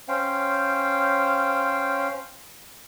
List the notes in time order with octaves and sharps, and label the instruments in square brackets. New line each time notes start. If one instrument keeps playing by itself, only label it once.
[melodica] C#4 C5 F5 G5